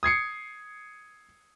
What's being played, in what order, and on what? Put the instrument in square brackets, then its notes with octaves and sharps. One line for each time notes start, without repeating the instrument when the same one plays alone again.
[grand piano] D#6 G#6 C7 C#7